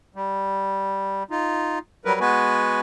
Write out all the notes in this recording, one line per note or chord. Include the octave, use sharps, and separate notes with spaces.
G3
D#4 F4
F#3 G3 A#4 B4
G#3 B3 F#4 B4 G#5